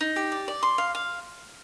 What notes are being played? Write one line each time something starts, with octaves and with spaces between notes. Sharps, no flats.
D#4
G4
D5
D5
C6
F5
F5